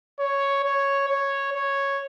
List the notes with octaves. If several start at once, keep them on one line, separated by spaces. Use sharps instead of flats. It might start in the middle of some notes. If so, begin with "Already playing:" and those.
C#5
C#5
C#5
C#5